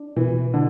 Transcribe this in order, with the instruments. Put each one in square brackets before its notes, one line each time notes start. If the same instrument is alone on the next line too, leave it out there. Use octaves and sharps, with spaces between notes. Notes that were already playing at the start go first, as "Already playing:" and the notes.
Already playing: [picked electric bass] D4
[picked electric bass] B2 [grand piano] E3
[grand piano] D3 [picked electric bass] D4